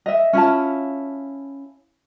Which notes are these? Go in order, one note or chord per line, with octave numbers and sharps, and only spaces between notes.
D#5 E5
C#4 E4 F4 A5